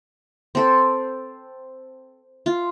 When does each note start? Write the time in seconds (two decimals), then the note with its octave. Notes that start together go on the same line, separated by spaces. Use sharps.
0.55 C4 A4
2.46 F4